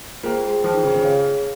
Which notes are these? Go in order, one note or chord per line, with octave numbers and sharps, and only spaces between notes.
A#3 F4 G#4 C5 G5
G#3
F3 F4 G#4 C5 G5
D#3
C#3
C#3
G#4 C#5 F5